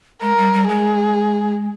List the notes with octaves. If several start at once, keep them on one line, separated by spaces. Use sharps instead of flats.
G#3 A#4
G3
G3
G#3 G#4